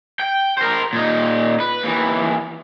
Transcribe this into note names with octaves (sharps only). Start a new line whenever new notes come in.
G5
A#4 C5
A#2 D#4
B4
D#2 E3